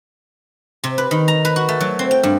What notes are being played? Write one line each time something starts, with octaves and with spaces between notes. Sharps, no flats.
C3
B4
D#3
A#5
B4
F#4
A3
F#3
C4
G5
G2